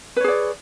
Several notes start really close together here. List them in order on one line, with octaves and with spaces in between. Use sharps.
B4 C#5 G#4 D5